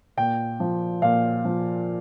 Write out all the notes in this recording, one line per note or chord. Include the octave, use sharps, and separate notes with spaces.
A#2 G5
F3
A#2 F5
F3